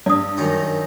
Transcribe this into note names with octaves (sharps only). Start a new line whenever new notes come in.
G2 D5 D#6
F#2 D#3 D#4